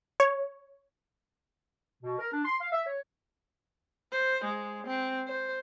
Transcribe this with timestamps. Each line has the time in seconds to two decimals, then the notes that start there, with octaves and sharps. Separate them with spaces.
0.20 C#5
2.03 B2
2.19 A#4
2.33 D4
2.45 C6
2.61 F5
2.72 E5
2.87 C#5
4.12 C5
4.44 G#3
4.87 C4
5.27 C5